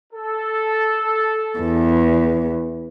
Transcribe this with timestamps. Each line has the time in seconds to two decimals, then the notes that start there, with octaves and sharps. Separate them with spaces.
0.13 A4
1.59 E2